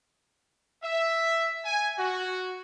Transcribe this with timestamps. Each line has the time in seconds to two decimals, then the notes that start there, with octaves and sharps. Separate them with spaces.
0.83 E5
1.65 G#5
1.98 F#4